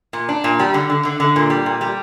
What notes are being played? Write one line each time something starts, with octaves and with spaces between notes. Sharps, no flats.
A#2
D4
A#2
G3
D3
D3
D3
D3
A#2
G3
A#2
G3